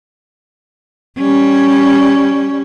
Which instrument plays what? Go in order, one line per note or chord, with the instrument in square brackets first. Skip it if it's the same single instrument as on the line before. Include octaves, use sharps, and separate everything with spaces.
[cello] G3 C#4